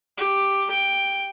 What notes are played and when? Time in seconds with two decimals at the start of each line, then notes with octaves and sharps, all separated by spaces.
0.17 G4
0.70 G5